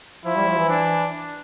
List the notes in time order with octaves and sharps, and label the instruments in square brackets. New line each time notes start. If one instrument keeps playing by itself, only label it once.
[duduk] F3 [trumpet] E4
[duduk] G3
F3
E3
[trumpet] D4